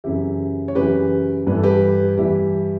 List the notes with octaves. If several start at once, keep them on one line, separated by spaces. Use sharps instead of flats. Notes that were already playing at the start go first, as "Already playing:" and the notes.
F#2 C#3 E3 E4 G4
C#5
F#2 C#3 E3 G4 B4
G2 E3 A4 B4
G4 B4
G2 E3 E4 G4